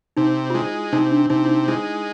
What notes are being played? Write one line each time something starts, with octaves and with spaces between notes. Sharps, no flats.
C3 D#4
F4
G#3 E4
C3 D#4
D4
C3 D#4
E4
D#4
G#3 E4